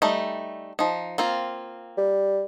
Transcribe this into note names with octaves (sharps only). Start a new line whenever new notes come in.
G3 A3 D#4
F3 D#4
A#3 C4 F4
G3